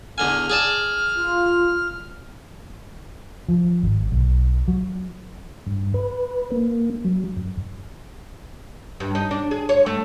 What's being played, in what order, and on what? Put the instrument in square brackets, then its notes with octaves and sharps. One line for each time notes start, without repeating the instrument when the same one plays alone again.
[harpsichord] E2 D3 G#5 [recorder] F6
[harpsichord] G#4 D5 A5
[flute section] F4
[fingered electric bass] F3
G#1
B1
F#3
[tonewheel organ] G2
B4
A#3
F#3
F#2
[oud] G2
D#4
D4
G#4
C#5
A3